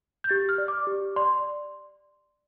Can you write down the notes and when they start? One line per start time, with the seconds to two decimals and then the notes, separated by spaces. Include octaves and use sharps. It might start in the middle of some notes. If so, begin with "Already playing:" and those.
0.24 G6
0.29 G4 A6
0.49 F6
0.58 D5
0.68 D6
0.87 G4
1.16 D5 C6